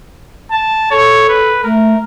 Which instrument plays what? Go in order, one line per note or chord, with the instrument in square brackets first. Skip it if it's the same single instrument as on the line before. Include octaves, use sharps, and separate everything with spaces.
[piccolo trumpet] A5
[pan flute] A4 [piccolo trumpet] C#5
[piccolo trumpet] B4
[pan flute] A3 [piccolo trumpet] A#4